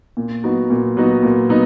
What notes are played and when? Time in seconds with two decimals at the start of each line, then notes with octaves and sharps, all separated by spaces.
0.17 A#2
0.43 F#3 B3 D#4 F#4
0.70 A#2
0.97 F#3 B3 D#4 F#4
1.23 A#2
1.49 F#3 B3 D#4